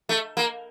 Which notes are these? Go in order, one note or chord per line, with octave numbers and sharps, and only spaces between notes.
A3
A#3